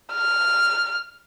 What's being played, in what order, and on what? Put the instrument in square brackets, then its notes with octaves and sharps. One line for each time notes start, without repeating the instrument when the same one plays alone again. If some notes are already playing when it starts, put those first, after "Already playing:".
[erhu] F6